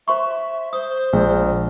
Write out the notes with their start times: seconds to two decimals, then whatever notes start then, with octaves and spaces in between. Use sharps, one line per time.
0.08 C5 E5 C6 C#6
0.73 C5 D#6
1.13 A#1 G#3